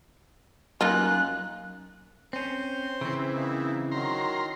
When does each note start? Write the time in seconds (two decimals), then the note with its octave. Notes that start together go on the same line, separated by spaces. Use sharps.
0.81 F#2 A#3 D#4 F4 F#6
2.33 C4 C#4 C5 C6
3.01 C#3 E3 C4 E4
3.35 A#3 D#4
3.92 D#3 F#3 A#5 C6